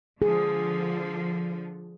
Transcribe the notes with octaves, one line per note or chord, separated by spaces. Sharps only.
D3 F3 G#4